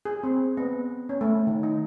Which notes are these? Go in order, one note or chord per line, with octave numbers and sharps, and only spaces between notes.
G#4
C4
B3
C#4
A3
D#3
D#4